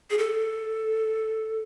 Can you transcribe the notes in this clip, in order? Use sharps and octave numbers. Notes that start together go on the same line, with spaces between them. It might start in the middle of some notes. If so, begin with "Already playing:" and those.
G#4
A4